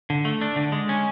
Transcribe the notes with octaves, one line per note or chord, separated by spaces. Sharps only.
D3
A3
D4
D3
G#3
C#4